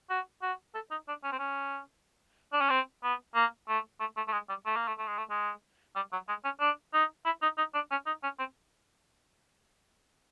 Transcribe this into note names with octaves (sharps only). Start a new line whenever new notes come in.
F#4
F#4
A4
D#4
D4
C#4
C4
C#4
D4
C#4
C4
B3
A#3
A3
A3
A3
A3
G#3
G3
A3
A#3
A3
A3
G#3
A3
G#3
G3
F#3
G#3
C#4
D4
D#4
E4
D#4
D#4
D4
C#4
D#4
C#4
C4